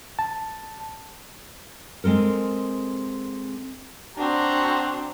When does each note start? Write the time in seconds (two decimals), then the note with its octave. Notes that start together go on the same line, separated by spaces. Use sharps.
0.19 A5
2.04 G#3 C4 A4 A#4
4.17 C4 D4 F#4 A#5